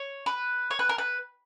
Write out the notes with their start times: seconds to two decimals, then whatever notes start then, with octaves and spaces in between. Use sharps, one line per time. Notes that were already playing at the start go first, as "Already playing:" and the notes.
Already playing: C#5
0.26 B4
0.71 C#5
0.79 B4
0.89 A#4
0.98 B4